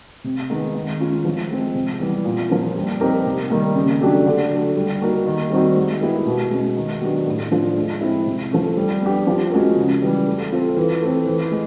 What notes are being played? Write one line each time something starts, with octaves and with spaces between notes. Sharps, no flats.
C3
D#3 G#3 B3 D#4
D#3
G#3 C#4 F4
F3
G#3 C4
C3
E3 G3 B3
A#2
F3 A#3
G3
C4 D#4 G4 A#4
C3
D#3 G3 A#3
C#3
F#3 A3 D4 G4
D3
F#3 A3
G3
A#3 D#4 F#4 A#4
D#3
G3 C4 D#4 F#4
G#3
B3 E4 G4 A#4
B2
G#3 C#4
D#3
F#3 B3 D4 G4
A2
F3 A3 D4 F4
G#3
C4 E4
C3
F3 A3 C#4
G3
B3 D4 G4
F3
G#3 C#4 F#4 A#4
C#3
E3 G3
A3
C4 F4 A4
E3
A3 C4
E3
G#3